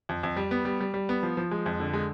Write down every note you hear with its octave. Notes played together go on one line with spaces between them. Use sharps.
F2
F2
G3
B3
G3
G3
G3
B3
F3
F3
G#3
F2
D3
G#3